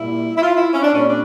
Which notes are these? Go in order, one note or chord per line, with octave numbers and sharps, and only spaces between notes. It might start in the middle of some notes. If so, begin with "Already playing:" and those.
Already playing: A#2 G3 A#3 E4
E4
F4
E4
C#4
D4
A#2 G3 C4 C#4
D4